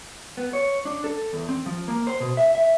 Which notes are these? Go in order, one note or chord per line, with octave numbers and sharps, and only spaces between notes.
B3
C#5
D4
A4
E2
C4
F3
A#3
C5
B2
E5
E5